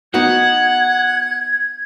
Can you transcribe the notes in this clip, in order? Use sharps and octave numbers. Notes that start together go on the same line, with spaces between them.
B3 D#4 F#4 F#5 G#6